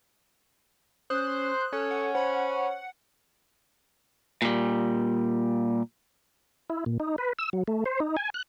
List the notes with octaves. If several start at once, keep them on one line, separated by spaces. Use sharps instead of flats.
C#4 C5 D#6 F#6
C#4 A4
F#5
C5 F#5 B5
A#2 G3
E4
A#2
D#4
B4
E6
F#3
A3
C5
D#4
G#5
F#6